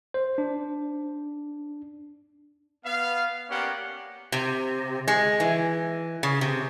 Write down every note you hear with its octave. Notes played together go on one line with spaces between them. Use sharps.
C5
D4
B3 F5
A#3 B3 C#4 G4 D5 F#5
C3
G#3
E3
C#3
C3